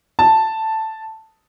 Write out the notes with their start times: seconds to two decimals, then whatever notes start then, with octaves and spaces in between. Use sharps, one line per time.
0.19 A5